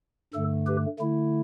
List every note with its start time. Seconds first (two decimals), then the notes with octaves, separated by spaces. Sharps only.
0.34 G2 D3 A3 A4
0.67 G4 B4
0.99 D3 A3 E4